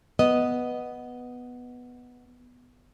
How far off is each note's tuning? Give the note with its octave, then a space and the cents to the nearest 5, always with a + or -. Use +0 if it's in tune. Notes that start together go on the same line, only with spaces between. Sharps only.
B3 +0 D#5 +0